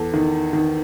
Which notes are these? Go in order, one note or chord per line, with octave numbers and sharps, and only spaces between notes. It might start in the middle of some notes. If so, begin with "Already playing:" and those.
Already playing: E2 A4
D#3
D#3